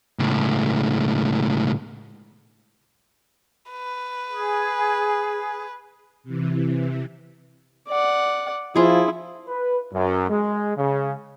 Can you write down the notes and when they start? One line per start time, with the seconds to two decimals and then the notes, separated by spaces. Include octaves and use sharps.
0.19 C#2 A2
3.71 B4
4.29 G#4
6.24 C3 E3
7.88 D5 F#5
8.76 F3 E4 F4 G#4
9.47 B4
9.92 F#2
10.29 G#3
10.76 C#3